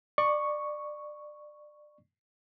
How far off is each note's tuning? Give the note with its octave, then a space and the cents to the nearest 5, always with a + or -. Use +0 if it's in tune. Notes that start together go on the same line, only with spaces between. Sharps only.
D5 +25 C#6 +0